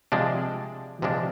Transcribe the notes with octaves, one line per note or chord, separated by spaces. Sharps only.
C3 F3 G#3 D4
C3 F3 G#3 D4